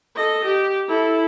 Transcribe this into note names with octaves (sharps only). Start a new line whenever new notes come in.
A4 D#5
G4
E4 A4